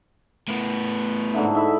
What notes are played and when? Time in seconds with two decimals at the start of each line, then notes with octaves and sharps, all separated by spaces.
0.48 A2 B3
1.34 G#2 D3 E4
1.55 G#2 E5 B5